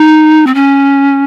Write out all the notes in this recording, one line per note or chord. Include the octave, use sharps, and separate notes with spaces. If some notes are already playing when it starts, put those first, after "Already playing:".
Already playing: D#4
C4
C#4